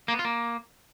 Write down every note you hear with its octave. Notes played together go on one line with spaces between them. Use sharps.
A#3
B3
F4
A#3